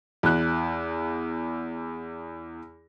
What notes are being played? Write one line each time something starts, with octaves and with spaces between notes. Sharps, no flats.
E2 F#6